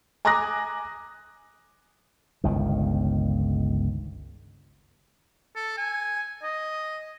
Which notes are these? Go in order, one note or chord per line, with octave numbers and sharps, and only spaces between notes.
G#5 A#5 D6 D#6 F#6 A#6
G1 C#2 D#3
A4
G#5
D#5